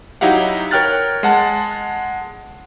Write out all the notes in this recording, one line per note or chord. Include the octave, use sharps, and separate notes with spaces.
F#3 D#4 E4 G4 F5 F#5
A#4 C#5 G5 F6 F#6 A6
G#3 F#5 A5